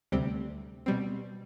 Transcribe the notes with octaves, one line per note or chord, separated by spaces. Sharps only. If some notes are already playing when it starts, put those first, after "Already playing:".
D2 C3 G3 C4
B2 G3 C4